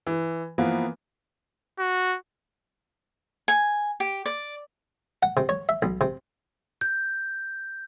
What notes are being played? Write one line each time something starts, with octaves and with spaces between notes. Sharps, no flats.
E3
E3 F3 A#3 B3
F#4
G#5
G4
D5
F#5
C3
C#5
E5
B1
C3
G6